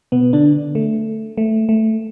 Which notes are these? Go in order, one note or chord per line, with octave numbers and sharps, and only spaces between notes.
B2 B3
D3 D4
A3
A3
A3